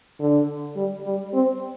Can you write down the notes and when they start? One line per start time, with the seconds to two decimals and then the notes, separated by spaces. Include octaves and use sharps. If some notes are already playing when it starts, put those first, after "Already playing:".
0.20 D3
0.76 G3
1.05 G3
1.33 C4